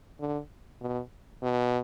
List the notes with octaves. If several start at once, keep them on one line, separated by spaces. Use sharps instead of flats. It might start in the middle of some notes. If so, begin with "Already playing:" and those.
D3
B2
B2